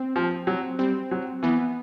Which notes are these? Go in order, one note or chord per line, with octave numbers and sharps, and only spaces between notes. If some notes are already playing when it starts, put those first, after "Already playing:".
Already playing: C4
F3
F#3
G3 C4
F#3
E3 B3